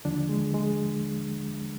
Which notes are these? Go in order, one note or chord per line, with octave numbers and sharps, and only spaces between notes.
D#2 D3 F3 D4
G#3
G#3